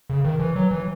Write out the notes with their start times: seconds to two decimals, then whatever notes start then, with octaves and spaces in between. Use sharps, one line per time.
0.10 C#3
0.24 D#3
0.40 E3
0.56 F#3
0.71 E3